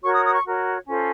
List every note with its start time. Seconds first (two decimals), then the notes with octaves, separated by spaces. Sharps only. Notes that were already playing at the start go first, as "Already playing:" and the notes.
0.03 F#4 A#4 C#5 C#6
0.14 D#6
0.25 D#6
0.35 C#6
0.45 F#4 A#4 C#5
0.86 C#4 F4 A4 C5